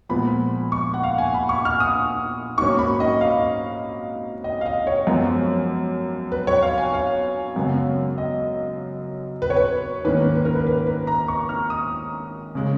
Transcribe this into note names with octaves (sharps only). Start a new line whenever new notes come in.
A#2 F3 G#3 B3 B5
C#6
F#5
F5
G#5
B5
C#6
F6
D#6
G#2 F#3 A#3 C#4 C#6
B5
D#5
F5
D#5
F5
D#5
C#5
F#2 F3 G#3 B3
B4
C#5
F5
G#5
F5
F#2 C#3 G#3 B3
D#5
B4
C#5
B4
G#2 D#3 A#3 C#4 B4
B4
A#4
B4
B4
B4
A#5
C#6
F6
D#6
C#3 G#3